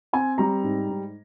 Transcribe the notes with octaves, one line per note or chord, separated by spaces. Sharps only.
C4 G#5
G3 A#5
G#2
G#2